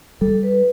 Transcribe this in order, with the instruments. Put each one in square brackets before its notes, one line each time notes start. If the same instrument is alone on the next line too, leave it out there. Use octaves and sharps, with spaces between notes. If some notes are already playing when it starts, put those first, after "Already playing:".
[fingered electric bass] G3 [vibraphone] A4
[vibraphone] B4